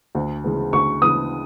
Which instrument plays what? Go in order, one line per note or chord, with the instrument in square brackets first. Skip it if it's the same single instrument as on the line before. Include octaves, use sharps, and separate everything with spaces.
[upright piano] D2
C#3 E3 G#3 B3
[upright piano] D2 [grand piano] C#6
[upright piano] C#3 E3 G#3 B3 [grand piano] D#6